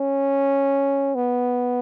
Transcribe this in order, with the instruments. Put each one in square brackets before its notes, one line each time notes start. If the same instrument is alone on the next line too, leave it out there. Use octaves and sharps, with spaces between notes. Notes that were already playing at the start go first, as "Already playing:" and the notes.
Already playing: [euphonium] C#4
B3